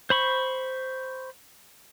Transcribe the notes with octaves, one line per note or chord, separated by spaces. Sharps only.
C5 B5 C#6